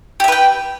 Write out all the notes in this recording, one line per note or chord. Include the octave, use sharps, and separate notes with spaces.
G4 B4 E5 G5